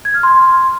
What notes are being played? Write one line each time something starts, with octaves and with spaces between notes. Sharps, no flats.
G#6
F6
C6